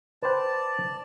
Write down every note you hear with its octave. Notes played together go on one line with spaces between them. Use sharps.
B4 C5 D5 G5 A5